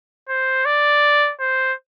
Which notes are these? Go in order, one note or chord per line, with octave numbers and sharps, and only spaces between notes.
C5
D5
C5